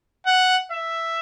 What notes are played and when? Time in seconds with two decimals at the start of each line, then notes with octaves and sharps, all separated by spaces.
0.26 F#5
0.71 E5